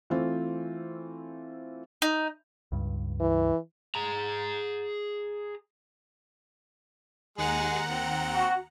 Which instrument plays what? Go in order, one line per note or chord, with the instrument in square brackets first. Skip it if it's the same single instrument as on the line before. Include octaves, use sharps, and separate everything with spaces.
[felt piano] E3 A3 C4 F4 C5
[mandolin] D#4
[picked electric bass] C#2 G2
[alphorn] E3
[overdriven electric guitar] G#4 A#5
[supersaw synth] D#2 F#5 A#5 [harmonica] G#3 G#4
[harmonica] C4
[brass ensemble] F#4